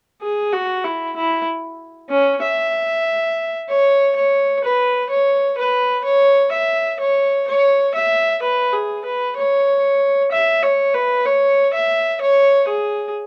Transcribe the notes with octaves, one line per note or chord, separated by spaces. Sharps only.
G#4
F#4
E4
E4
C#4
E5
C#5
C#5
B4
C#5
B4
C#5
E5
C#5
C#5
E5
B4
G#4
B4
C#5
E5
C#5
B4
C#5
E5
C#5
G#4